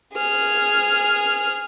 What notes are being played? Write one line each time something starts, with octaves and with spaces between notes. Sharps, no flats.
G#4 F6